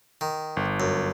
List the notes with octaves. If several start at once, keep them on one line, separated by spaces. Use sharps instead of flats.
D#3
G1
F#2